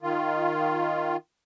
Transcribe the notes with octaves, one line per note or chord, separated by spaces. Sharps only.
D#3 F4